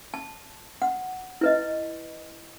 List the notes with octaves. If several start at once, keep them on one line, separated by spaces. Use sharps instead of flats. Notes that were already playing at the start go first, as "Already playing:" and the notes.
A5
F#5
E4 B4 D#5